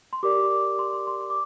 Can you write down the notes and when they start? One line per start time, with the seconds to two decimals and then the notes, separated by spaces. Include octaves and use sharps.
0.13 C6
0.23 G4 A#4 D5 D6
0.79 C6
0.93 C6
1.07 C6
1.21 C6
1.30 D6